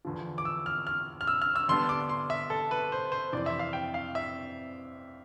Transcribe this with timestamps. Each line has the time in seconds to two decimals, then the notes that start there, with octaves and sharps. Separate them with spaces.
0.05 E2 D3 F3
0.38 D6
0.45 E6
0.66 F6
0.87 F6
1.21 F6
1.27 E6
1.42 F6
1.56 E6
1.68 D3 G3 B3 D4 C6
1.89 D6
2.09 C6
2.30 E5
2.50 A4
2.71 B4
2.92 C5
3.12 C5
3.32 F2 C3 E3 D5
3.46 E5
3.59 F5
3.73 G5
3.94 F5
4.15 E5